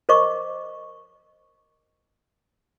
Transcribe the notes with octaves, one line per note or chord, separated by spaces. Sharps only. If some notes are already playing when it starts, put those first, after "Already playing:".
A#4 C5 D#5 C#6 D6